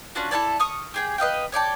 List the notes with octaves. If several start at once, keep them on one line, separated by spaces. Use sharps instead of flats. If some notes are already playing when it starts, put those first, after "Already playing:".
C#4 D4 F4 F#4
E4 A4 C#5 D5
C#6 D#6 F6
G4 G#4 G5
B4 D#5 F5 G5
C#5 D5 G5 A5